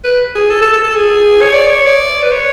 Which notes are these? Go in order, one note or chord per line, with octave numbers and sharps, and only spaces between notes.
B4
G#4
A4
A4
A4
A4
G#4
C#5
D5
C#5
D5
B4
C#5